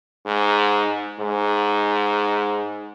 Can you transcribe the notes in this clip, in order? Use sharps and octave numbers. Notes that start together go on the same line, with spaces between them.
G#2
G#2